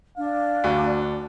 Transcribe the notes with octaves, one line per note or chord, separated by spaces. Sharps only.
D4 F5
D2